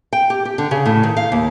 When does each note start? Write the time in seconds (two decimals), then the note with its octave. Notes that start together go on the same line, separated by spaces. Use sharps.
0.13 G5
0.30 G4
0.45 G4
0.58 D3
0.71 C#3
0.86 A2
1.03 D#3
1.17 F5
1.32 D#2